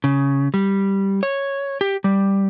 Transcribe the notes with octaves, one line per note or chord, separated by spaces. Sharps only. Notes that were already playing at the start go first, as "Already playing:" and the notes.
C#3
G3
C#5
G4
G3